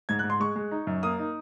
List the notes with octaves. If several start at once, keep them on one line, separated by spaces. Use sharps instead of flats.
G#2 G#6
F#6
G#2
C6
G#3 C#6
G#3
D#4
F#2
A#3 D#6
D#4